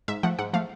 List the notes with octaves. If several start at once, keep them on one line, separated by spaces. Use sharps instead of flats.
G#2 E5
F3 A3 F#5
G#2 F#5
F3 A3 F5